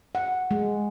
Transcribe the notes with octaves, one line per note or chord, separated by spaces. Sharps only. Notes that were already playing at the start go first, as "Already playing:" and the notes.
F#5
G#3